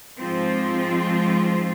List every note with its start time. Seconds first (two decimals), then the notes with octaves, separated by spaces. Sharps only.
0.19 G#2 F3 G#3 C4 F4